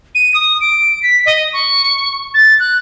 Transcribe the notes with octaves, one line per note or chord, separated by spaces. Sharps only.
D#7
D#6
D7
B6
D#5
C#6
A6
F#6